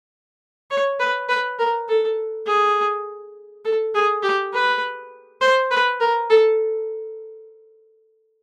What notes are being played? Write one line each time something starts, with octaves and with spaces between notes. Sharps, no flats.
C#5
B4
B4
A#4
A4
G#4
A4
G#4
G4
B4
C5
B4
A#4
A4